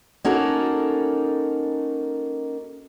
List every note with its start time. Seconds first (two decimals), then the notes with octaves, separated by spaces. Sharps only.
0.25 A#3 C#4 D#4 F#4 A4 A#4